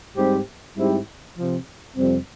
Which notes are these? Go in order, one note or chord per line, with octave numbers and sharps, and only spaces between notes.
G#2 G3 C4 G4 C5
G#2 G3 C4 E4 G4
C3 F3 C4
F2 C3 G3 C4